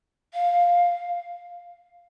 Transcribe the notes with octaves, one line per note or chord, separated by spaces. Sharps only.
F5